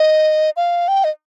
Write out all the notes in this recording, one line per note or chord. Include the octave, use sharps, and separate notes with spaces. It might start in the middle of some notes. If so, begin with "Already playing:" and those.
Already playing: D#5
F5
G5
D#5